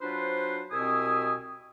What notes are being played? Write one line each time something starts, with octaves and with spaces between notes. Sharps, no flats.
F#3 D4 F4 B4 C5
C2 B2 C4 E4 G#5 D#6